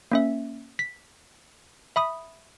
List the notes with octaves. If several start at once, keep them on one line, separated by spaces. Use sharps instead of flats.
A#3 C#4 E5
B6
E5 B5 D#6